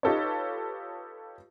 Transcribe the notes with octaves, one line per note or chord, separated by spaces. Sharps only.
D#4 F4 G4 A4 B4 C#5